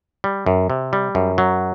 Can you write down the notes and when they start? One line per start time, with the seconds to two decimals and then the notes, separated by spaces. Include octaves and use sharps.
0.24 G3
0.46 F#2
0.70 C3
0.93 G3
1.15 F#2
1.38 F#3